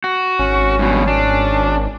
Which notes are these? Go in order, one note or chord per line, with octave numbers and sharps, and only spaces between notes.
F#4
G#1 C#4
G2 B2
D4